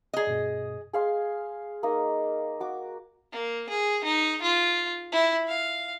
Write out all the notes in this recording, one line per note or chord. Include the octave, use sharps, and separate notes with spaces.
G#4 D#5
G2 B2
G#4 F5 C6
A#3 D#4 D#5 F5
F#4 D6
A#3
G#4
D#4
F4
E4
F5